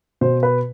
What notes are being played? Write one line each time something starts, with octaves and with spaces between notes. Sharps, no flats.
B2 C5
B4